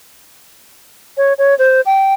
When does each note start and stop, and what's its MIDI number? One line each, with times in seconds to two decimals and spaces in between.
1.17 1.33 73
1.38 1.57 73
1.59 1.81 72
1.86 2.14 79